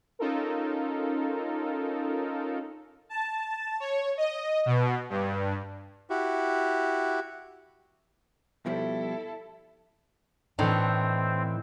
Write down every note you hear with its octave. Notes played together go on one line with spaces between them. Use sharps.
C#4 D#4 F4 A4 A#4
A5
C#5
D#5
B2
G2
E4 F#4 G4
B2 F3 G3 E4 A4
A2 E3 C4 D4 D#4